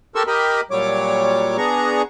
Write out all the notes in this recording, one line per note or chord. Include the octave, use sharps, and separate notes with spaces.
G4 A4 A#4 C6 C#6 E6
G4 A#4 D#5 B5
A#2 F#3 G3 C#5 D6
B3 D4 G#4 A#5 C#6